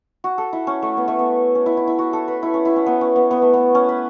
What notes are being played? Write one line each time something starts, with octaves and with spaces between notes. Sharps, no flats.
F#4
A4
E4
C#4
A3
B3
A3
B3
C#4
E4
E4
E4
F#4
A4
B4
E4
C#4
E4
C#4
B3
C#4
B3
B3
A3
B3
C#4
B4